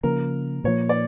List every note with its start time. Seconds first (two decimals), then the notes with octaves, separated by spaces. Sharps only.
0.03 C#3 F3 A#3 A#4
0.64 A#2 F3 A#3 C#5
0.89 D5